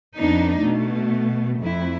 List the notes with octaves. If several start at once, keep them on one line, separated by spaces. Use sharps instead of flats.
F2 B3 D4 D#4
B2 A3
F2 E4